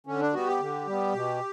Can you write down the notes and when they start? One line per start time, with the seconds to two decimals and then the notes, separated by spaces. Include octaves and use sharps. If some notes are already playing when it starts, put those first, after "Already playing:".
0.06 D3 C#4
0.21 D4
0.34 G3 B3 F#4
0.47 G4
0.60 D3
0.87 G3 B3
1.14 B2